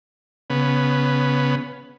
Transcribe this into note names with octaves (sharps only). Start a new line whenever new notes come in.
C#3 B3